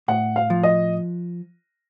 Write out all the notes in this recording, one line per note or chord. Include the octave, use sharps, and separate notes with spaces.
A2 F#5
F5
F3
D#5